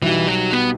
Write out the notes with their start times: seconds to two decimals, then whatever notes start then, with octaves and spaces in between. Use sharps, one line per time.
0.02 B1 B2 E3 G3 D#4 G4
0.28 F#3
0.53 B3